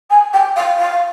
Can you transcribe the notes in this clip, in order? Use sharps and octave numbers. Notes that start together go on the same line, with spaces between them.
G#5
G5
F5
F5